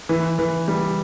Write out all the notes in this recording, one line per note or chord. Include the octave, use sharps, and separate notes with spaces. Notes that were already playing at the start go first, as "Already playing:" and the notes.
E3
E3
G3